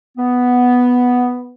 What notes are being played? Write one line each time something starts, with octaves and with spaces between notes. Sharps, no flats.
B3